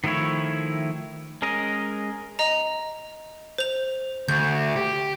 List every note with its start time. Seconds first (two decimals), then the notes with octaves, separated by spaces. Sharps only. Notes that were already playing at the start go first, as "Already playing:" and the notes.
0.04 D#3 F3 A3 E4 C#5
1.42 G#3 C#4 A#4 D#5
2.39 D#5 A#5
3.58 C5 F7
4.29 D2 G6
4.76 G4